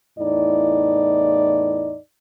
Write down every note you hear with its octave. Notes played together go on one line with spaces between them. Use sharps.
E2 A2 D#4 D5